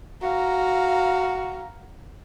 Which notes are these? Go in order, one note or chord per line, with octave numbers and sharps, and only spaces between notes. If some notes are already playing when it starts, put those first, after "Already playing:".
F#4 F5 A#5